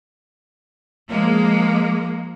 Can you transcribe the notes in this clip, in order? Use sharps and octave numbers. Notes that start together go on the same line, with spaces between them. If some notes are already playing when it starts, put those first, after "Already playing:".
F3 G#3 A#3